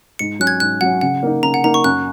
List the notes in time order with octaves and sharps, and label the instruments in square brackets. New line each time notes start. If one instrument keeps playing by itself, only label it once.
[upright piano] G#2 [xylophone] C#7
[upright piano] F#3 C#4 [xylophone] F#6
[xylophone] G#6
[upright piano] G#2 [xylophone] F#6
[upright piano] F#3 C#4 [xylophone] F#5
[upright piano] C#3 [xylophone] F#5
[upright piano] A#3 D#4
[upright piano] C#3 [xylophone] A#5
[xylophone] F#5
[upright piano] A#3 D#4 [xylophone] A#5
[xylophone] C#6
[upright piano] F#2 [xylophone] F#6